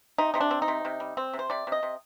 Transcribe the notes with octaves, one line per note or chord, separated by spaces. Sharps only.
C3 D#4
C3 D#4
D4
C4
D#4
C3
C3
G3
C4
C3
C5
C3 D5
C3 D#5
C3